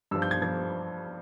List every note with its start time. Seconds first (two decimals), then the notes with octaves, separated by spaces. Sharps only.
0.11 G2 F3 E6
0.22 G6
0.31 G#6
0.42 F3 G#6